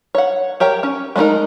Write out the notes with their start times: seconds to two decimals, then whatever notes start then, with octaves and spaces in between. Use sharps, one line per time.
0.15 C#5 F#5
0.60 G4 A#4 C#5 G5
0.83 C#4
1.16 G#3 A3 D4 D#4 A#4